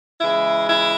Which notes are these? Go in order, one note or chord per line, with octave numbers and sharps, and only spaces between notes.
C#3 E3 G#3 E4
E4